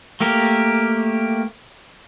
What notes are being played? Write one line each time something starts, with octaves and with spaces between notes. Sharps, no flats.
A3 A#3 G4 A#4